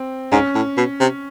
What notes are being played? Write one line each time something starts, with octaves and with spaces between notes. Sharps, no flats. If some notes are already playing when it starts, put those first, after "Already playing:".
Already playing: C4
G#2 C#4
A2
B2
C3